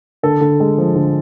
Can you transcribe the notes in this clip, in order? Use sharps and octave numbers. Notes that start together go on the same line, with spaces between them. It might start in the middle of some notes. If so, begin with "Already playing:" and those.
D3 A4
D3
G#3
F3
D3